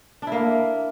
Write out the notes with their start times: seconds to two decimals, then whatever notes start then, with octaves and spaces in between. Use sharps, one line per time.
0.22 D4
0.27 E4
0.32 A#3